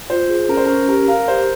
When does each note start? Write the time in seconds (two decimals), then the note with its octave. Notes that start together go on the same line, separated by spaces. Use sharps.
0.10 F4 C5
0.29 G#4
0.48 C#4 A#4
0.57 C5
0.66 C#4 A#4
0.88 G4 A#4
1.08 A#4 F5
1.28 G4 C5